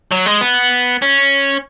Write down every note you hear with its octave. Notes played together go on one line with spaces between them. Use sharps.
F#3
G#3
B3
C#4